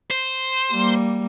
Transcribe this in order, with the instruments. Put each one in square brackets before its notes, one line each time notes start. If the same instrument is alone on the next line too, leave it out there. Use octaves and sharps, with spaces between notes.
[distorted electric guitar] C5
[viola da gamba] G3 A#3